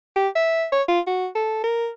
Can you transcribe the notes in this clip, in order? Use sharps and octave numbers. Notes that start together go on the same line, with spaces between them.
G4
E5
C#5
F4
F#4
A4
A#4